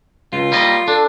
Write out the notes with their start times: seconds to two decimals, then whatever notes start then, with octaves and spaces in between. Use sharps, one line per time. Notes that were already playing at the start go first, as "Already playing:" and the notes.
0.33 C#2 F4
0.52 G3 A#3 D#5
0.88 D4 A4